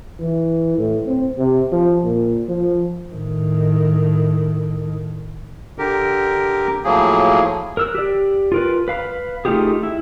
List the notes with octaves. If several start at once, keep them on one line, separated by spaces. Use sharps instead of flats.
E3
A2
C4
C3
F3
A#2
F3
A2 D#3
D3 G4 A#4
A2 F3 F#3 A#3 G#4
A#4 E6 F#6
G4 D5
F4 A#4 B4
B4 F5 B5
A3 D#4 F4 G4 G#4
E4